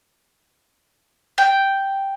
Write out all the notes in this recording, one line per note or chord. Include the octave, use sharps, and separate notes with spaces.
G5